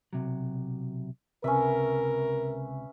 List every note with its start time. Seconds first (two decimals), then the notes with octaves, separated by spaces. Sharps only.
0.13 B1 C3 F#3
1.44 C#2 C3 C#4 A#4 B4 E5